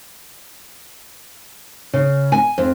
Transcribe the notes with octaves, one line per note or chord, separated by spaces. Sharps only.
C#3
G#5
F2